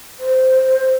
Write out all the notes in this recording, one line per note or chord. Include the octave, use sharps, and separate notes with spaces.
C5